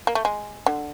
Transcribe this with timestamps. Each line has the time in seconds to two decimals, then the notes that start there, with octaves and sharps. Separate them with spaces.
0.07 A#3
0.15 A3
0.25 G#3
0.66 D3